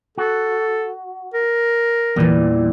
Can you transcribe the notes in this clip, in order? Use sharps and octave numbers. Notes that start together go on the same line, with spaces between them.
F#4 A4
A#4
E2 A#2 E3 G3